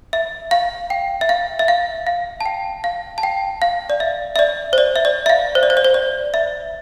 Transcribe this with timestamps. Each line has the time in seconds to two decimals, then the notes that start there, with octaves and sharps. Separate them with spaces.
0.13 E5
0.51 F5
0.90 G5
1.21 E5
1.29 F5
1.59 E5
1.68 F5
2.07 F5
2.41 A5
2.46 G5
2.84 F5
3.18 A5
3.23 G5
3.62 F5
3.90 D5
4.00 E5
4.36 E5
4.39 D5
4.73 C5
4.78 D5
4.96 E5
5.05 D5
5.26 E5
5.29 F5
5.55 C5
5.63 D5
5.70 C5
5.77 D5
5.84 C5
5.94 D5
6.34 E5